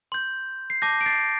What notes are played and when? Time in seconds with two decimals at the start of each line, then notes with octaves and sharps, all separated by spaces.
0.12 C6 G6
0.70 C7
0.82 A5 D6 G6 A#6
1.01 D7
1.06 A6 C7